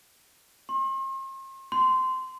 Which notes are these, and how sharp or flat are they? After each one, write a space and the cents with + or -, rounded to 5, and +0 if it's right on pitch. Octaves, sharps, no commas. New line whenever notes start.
C6 +40
C6 -15